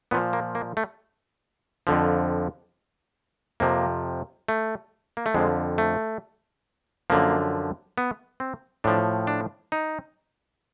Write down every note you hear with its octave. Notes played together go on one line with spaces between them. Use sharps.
A#2 F3 B3
A#3
A#3
A3
F2 D3 F3
F2 C3 F3 A#3
A3
A#3
A3
F2 D3 F3 G#3
A3
F#2 D3 F3 A#3
B3
C4
A2 F3 D4
D4
D#4